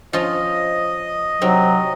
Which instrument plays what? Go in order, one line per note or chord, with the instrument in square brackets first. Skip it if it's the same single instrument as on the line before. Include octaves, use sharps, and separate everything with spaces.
[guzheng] F3 C#4 F4 [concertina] D#5
[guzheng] C3 C4 D#4 [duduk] F#3